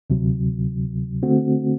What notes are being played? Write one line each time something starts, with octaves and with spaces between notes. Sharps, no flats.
D2 C3 F#3
D3 A3 C4 F#4